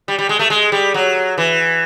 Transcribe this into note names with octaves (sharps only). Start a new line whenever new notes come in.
G3
G3
G#3
A3
G#3
G3
F#3
E3